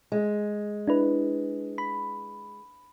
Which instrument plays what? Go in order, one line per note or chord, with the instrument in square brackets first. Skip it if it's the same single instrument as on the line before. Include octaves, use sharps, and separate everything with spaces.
[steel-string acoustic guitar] G#3
[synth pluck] D4 E4 B4
B5